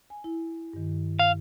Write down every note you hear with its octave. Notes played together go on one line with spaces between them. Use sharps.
G#5
E4
G2 D#3
F5